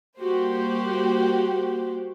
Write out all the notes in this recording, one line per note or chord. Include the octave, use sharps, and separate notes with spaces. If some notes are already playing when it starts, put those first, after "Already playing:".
G3 A#3 F#4 G4 C5